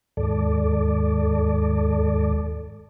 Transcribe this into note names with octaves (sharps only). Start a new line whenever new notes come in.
D#2 G#2 A4 D5